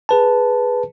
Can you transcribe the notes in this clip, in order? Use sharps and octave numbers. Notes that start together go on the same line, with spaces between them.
G#4 B4 A5